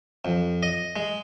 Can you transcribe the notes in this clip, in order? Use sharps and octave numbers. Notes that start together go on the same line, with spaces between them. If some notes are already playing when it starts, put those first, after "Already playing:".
F2
D#5
G#3